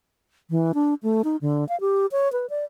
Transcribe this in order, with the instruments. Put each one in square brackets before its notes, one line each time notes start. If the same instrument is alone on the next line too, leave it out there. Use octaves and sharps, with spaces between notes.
[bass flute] E3
D4
A3
D#4
D3
F5
G4
C#5
B4
D5